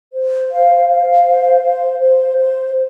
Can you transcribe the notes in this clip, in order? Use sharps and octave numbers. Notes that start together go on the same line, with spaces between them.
C5
F5
F5
C5
C5
C5
C5